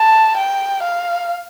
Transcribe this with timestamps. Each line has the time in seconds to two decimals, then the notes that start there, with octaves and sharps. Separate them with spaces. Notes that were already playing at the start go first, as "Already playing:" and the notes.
Already playing: A5
0.37 G5
0.83 F5